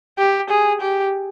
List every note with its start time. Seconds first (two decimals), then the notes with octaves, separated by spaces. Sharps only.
0.18 G4
0.50 G#4
0.81 G4